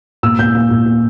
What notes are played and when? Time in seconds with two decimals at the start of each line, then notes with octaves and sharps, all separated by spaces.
0.23 A#2 E6
0.39 A#2 G6
0.55 A#2
0.70 A#2
0.86 A#2